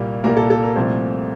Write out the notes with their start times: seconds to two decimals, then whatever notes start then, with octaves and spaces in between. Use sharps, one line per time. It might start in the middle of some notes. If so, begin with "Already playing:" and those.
Already playing: C2 A#2 G3 A#3
0.24 C2 A#2 G3 A#3 A#4
0.37 A4
0.50 A4
0.63 A#4
0.76 C2 A#2 F3 A3 C4 C5